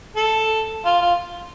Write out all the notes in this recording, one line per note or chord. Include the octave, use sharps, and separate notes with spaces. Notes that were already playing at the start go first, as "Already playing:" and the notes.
A4
F4
F4